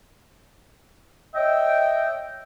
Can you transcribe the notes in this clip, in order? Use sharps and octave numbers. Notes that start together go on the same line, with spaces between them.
C#5 D#5 E5 G5